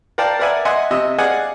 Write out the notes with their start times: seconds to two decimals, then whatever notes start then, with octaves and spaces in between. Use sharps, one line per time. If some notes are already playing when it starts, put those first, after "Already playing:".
0.18 A#4 D5 F5 G5 A5
0.39 A#4 B4 D5 E5 F#5 G#5
0.65 D#5 E5 F#5 G#5 C6
0.91 C3 D#5 E5
1.18 G#4 D5 D#5 F5 F#5 G#5